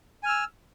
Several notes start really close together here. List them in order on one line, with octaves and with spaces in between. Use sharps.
G#5 F6 E6